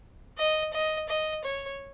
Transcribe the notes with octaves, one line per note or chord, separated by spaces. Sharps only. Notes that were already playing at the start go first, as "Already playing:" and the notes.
D#5
D#5
D#5
C#5